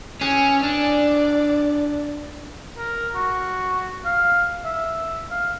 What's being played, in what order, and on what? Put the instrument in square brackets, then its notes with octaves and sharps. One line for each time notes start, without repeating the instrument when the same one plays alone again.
[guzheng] E3 G#4 [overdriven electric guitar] C#4
[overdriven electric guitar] D4 [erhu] D5
[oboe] A#4
F#4
F5
E5
F5